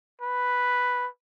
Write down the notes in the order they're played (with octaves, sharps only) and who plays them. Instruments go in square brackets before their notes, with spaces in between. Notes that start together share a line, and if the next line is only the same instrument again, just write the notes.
[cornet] B4